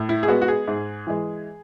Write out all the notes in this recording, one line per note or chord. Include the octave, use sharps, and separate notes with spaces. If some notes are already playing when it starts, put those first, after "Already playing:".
Already playing: A2
E4
G#4
G#3 B3 F#4
F#4
G#4
G#2
E3 G#3